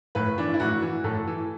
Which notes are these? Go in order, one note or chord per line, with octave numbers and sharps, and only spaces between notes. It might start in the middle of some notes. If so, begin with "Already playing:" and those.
A2 B4
E3 D4
E4
A2 F#4
E3
A2 A4
E3